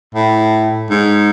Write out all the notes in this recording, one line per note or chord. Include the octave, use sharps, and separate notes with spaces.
A2
G#2